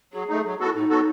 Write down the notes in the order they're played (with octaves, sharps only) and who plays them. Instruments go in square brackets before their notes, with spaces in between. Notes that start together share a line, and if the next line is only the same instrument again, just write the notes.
[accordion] F#3 [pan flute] G#4
[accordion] A3 D#4
F#3
[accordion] B3 F#4 A4 [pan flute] E4
[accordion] A2 [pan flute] D#4
[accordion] F#3 B3 F#4 A4